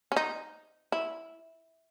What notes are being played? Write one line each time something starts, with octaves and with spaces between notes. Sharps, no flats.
C#4
D#4
E4